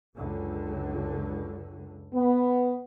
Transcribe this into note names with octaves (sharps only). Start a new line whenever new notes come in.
C#2 F#2 D3
B3